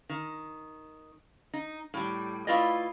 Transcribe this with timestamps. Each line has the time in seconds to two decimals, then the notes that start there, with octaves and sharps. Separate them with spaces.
0.09 D#3
1.54 D#4
1.94 A2 G3
2.47 A3 E4 F4 B4 D5 D#5